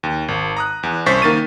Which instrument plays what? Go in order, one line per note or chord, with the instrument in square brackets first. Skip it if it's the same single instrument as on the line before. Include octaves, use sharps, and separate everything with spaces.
[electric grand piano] D#2
G#1
A#5 D#6 F#6
E2
C2 C#4 C5 C#6 A6 B6
D#3 A#3 A6 D#7